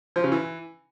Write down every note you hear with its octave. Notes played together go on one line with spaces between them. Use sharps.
F3
C#3
E3